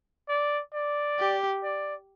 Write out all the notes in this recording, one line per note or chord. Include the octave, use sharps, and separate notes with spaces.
D5
D5
G4
D5